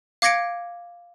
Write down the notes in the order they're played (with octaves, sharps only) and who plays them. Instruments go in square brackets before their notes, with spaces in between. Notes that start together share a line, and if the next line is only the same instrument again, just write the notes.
[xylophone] F5 D6 G#6 A#6 C#7 D7